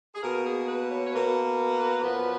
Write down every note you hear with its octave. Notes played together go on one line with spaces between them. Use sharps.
G#4
B2 A#3 A#4
G#4
B4
C#5
C#5
B2 A#3 B4
F#2 F3 B3